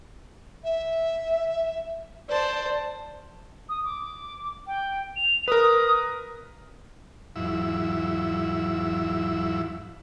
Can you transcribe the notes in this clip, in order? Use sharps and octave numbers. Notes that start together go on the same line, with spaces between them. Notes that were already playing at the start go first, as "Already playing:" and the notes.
E5
C5 D5 A5
D#6
D6
G5
F7
A#4 B4 D#6
E2 G#2 F3 F#3 E4 E6